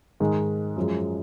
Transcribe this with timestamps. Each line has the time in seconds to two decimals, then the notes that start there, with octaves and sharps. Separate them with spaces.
0.20 G#2 D#3 G#3
0.77 F#2 F3 G#3